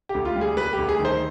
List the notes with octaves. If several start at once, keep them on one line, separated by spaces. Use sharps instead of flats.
G4
D2
F4
G3
G#4
G3 B4
G4
D2
G#4
D#3
C5